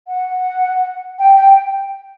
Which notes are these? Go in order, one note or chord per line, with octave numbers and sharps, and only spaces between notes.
F#5
G5
G5